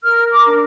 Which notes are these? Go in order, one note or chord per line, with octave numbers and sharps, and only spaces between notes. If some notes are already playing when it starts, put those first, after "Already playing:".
A#4 F6
D6
D4